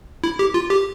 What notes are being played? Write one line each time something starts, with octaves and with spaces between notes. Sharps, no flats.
E4
G4
F4
G4